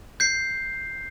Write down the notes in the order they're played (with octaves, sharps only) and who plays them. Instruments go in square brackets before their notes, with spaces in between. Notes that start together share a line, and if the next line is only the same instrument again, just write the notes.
[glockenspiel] G6 C7